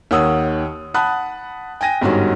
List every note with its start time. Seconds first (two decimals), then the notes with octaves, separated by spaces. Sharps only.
0.11 D#2 D#3 C#5 F#5 D#6 E6
0.94 F#5 A5 B5 D#6 F#6
1.81 G5 G#5 A#6 D#7
2.01 G1 G#2 G3 C#4 F#4